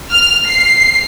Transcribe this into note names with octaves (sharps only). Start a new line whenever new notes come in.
F6
C7